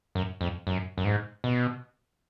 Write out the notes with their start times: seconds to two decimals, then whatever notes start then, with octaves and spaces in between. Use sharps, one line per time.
0.15 F#2
0.41 F2
0.67 F#2
0.98 F#2
1.05 G#2
1.44 B2